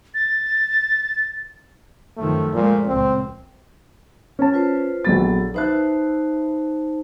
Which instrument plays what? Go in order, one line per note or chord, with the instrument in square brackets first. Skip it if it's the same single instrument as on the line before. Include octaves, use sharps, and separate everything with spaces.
[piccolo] A6
[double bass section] F#2 D#3 F3 [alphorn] A3
[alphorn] A#2 [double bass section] F3 G#3 A3
[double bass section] C#2 A#2 [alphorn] C4
[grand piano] C#4 A5
[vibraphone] F4 B4 C5
[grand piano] A#1 F#3 A6 [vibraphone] B3 A4
[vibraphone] D#4 C5 A5 [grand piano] B4 E5 F#6